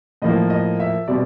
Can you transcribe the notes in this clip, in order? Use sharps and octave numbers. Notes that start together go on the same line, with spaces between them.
A2 F3 A#3 D#5
D#5
E5
B2 G3 C4 D5